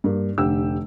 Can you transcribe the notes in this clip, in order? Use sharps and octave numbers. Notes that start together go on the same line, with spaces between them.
G2 A#3
F1 D3 G4 G5 E6